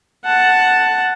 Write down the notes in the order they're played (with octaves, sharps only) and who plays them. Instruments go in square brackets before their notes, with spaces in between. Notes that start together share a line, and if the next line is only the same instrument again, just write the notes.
[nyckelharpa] F#5 A5